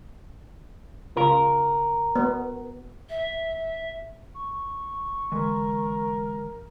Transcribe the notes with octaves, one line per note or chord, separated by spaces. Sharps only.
C#3 F4 A#4
B3
E5
C#6
D3 E3 G#3 A#4